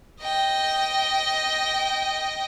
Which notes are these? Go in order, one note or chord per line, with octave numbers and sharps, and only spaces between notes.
D#5 G5